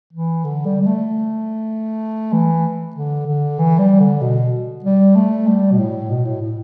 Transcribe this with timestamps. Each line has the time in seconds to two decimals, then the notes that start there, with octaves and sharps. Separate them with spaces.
0.13 E3
0.44 D3
0.65 G3
0.81 G3
0.86 A3
2.32 E3
2.95 D3
3.27 D3
3.59 E3
3.78 G3
4.00 D3
4.21 B2
4.84 G3
5.15 A3
5.47 G3
5.71 B2
5.78 A2
6.10 B2
6.25 A2
6.41 A2